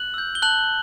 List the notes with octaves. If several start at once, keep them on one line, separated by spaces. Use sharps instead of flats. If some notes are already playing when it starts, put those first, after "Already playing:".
Already playing: F#6 F#7
E6 G6
G7
A5 F#6 F#7